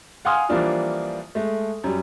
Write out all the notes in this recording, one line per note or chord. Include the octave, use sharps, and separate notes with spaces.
F5 F#5 G#5 C6 D#6 F6
E3 F3 G3 A#3 D4 F4
G#3 A3
F#2 G3